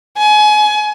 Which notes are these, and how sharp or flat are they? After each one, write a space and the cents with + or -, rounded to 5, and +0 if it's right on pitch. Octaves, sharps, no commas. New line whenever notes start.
G#5 +30